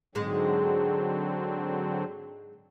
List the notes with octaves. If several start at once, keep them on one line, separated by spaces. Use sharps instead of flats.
G#2 D3 F#3 G#3 C4